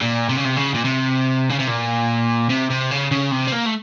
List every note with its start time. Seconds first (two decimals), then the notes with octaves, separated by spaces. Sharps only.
0.02 A#2
0.30 C3
0.37 C#3
0.45 C3
0.57 C#3
0.74 A#2
0.85 C3
1.49 C#3
1.59 C3
1.67 A#2
2.49 C3
2.70 C3
2.91 C#3
3.11 C#3
3.31 C3
3.48 C4
3.52 A#3
3.66 A3